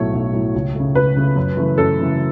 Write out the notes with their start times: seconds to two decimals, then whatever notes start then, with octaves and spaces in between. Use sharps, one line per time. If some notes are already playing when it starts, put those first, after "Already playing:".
Already playing: B1 A2 F#3 A3 C#5
0.13 B1
0.33 A2 F#3 A3
0.54 C#2
0.75 C#3 A3
0.95 C#2 B4
1.16 C#3 A3
1.36 F#2
1.57 C#3 E3 A3
1.78 F#2 A4
1.99 C#3 E3 A3